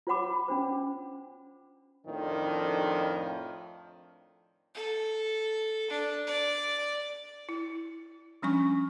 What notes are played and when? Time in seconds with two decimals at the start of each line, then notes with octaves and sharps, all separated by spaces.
0.07 F4 C5 C#5 F#5 B5 D6
0.48 C#4 D4 C5
2.07 F2 A2 D#3 F3 D4
4.75 A4
5.90 D4
6.27 D5
7.49 E4
8.42 F3 G3 C#4 D4 G#5 C#6